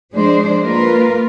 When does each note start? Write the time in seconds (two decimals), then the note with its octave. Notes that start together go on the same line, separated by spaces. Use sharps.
0.13 F3 G#3 D4 C5
0.63 A#3 F4 A#4 B4